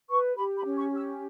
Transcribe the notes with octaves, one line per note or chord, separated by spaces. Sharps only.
B4 C#6
G4 B5
B5
C#4
C#6
G4
E6